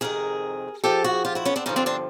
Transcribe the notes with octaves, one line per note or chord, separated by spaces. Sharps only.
F2 C3 D#3 G#4 A#4
G#2 F3 G4 A4
F#4 G#4
F4 G4
E4 F#4
B3 C#4
C4 D4
G2 D3 F3 C#4 D#4
C4 D4
C4 D4